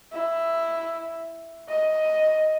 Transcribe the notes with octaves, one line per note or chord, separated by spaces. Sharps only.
E4
D#5